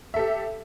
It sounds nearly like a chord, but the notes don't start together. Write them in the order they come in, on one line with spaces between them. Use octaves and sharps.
E5 A4 G4